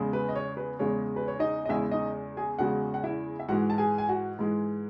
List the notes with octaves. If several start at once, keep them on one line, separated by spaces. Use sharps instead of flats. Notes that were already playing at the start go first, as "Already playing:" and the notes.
Already playing: E2 C#3 G#3
B4
D#5
C#5
B4
E2 C#3 G#3 C#5
B4
C#5
D#4 D#5
D#5
E2 C#3 G#3 E4 E5
D#4 D#5
G#4 G#5
E2 C#3 G#3 F#4 F#5
F#5
E4 E5
E5
G#2 E3 G#3 F#4 F#5
A5
G#4 G#5
G#5
F#4 F#5
G#2 E3 G#3